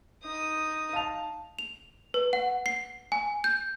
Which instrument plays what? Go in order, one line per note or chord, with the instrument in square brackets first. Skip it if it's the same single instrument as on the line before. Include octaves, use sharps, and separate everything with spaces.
[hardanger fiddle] D#4 D#6
[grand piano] F5 A5 F7
[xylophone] F7
B4
F#5
C7
G#5
G6